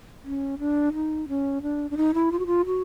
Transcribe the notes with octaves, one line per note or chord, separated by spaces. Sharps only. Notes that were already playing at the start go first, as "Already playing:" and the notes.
C#4
D4
D#4
C#4
D4
D4
D#4
E4
F4
F#4
F4
F#4